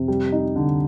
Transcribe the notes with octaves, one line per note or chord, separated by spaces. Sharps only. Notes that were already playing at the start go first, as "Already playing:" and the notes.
Already playing: F2 C3
G3
D#4
D3